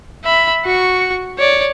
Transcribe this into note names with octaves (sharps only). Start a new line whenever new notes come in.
E5 B5
F#4 C#6
C#5 D5